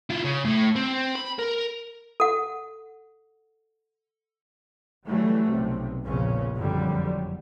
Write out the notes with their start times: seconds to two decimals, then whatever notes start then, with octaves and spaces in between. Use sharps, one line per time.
0.10 E4 F4
0.25 C#3
0.45 A2
0.76 C4
1.16 B5
1.39 A#4
2.20 A4 F#5
5.06 E3 F#3 G3 A3
5.50 B1 C3
6.03 A#1 E2 A#2 C#3 C#4
6.55 F#1 F2 D3 F#3 G3